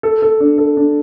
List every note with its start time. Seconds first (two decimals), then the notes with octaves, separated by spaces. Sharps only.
0.03 A4
0.22 A4
0.40 D4
0.58 A4
0.77 D4